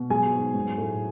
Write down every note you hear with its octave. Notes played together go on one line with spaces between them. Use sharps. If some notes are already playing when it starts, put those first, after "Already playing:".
Already playing: B2
F#3 G#4 G#5
G#2
F#3
A2